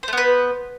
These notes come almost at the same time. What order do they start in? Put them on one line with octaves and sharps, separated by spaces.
C5 A3 B3 B4